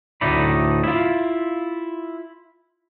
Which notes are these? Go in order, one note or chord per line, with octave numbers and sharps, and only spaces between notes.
D2 A2 A3 D#4 D5 B5
E4 F4